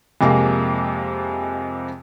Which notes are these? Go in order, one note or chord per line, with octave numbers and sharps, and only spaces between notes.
F2 C3 G#3 A#3